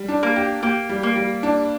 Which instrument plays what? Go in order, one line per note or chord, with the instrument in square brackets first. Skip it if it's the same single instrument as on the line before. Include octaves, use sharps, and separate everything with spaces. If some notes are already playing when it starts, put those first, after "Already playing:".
Already playing: [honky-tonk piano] G3
D4
[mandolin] A#3
[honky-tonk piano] G4
[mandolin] A#3 [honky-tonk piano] G4
[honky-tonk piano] G3
[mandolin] A#3
[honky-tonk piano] G3
D4